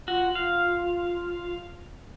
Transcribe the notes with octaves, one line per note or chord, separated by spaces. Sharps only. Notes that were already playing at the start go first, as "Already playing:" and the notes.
F4 F#4
F4 F5